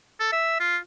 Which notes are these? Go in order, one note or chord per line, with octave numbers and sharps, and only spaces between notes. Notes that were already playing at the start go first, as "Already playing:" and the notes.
A4
E5
F4